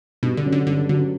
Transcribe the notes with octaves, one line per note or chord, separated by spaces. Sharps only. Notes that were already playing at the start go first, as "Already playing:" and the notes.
G2 B2
D3
F#3 C#4
D3
G2 D3
D3 F#3 C#4